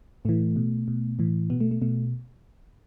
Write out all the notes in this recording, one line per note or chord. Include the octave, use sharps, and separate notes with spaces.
A2 E3 A3
B2
B2
A2 E3
B2 B3
A3
A3
B2 A3